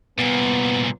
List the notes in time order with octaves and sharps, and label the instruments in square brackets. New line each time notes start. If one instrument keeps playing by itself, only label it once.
[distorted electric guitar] C2 A#2 [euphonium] B3